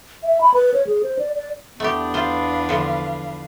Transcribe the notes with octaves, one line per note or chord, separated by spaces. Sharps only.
E5
B5
B4
C#5
G#4
C5
D5
D5
E2 A3 B3 D4 G4
F4 B4 C5 F5
D3 F3